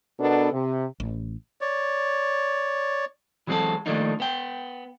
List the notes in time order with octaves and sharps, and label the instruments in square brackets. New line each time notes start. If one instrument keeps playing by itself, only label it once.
[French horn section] B2 B3 D4 A4 A#4
C3
[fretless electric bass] A1
[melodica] C#5 D5
[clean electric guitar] E3 F#3 G#3 C4 F#4 A4
D#3 F3 A3 A#3 D4 D#4
B3 G5